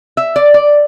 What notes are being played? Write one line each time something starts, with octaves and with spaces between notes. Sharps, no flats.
E5
D5
D5